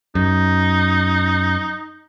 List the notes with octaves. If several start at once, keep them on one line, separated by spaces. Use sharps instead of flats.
F#2 D#4